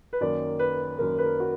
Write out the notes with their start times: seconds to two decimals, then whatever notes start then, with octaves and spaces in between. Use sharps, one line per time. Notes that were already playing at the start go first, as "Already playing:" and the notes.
0.13 B4
0.21 F#2 D#3 A#3 D5
0.59 B4
0.98 F#2 D#3 A#3 A#4
1.18 B4
1.24 A#4
1.40 F#4